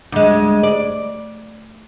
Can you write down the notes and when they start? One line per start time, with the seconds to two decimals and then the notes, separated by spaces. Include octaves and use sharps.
0.12 D2 G#3
0.63 D5